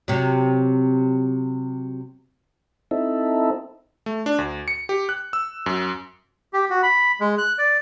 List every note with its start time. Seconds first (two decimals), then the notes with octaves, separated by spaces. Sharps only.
0.08 C3 F#3
2.91 C4 D#4 E4 A4
4.06 A3
4.26 D4
4.38 D2
4.68 C#7
4.89 G4
5.09 F#6
5.33 E6
5.66 F#2
6.53 G4
6.70 F#4
6.83 B5
7.21 G#3
7.38 F#6
7.58 D5